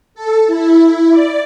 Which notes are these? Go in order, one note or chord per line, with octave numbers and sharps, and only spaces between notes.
A4
E4
D5